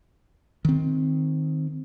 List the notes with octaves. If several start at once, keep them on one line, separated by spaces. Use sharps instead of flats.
D#3 C4